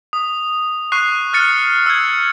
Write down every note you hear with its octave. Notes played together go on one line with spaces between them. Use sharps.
D#6
C#6 F#6 C7
F6 F#6 A6 C#7
E6 G#6